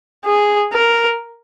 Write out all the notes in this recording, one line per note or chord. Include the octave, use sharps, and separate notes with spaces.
G#4
A#4